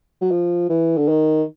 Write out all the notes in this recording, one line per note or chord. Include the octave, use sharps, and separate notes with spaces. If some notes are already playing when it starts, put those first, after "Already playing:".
F#3
F3
E3
D3
D#3